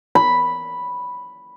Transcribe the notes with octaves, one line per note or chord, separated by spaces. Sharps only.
B5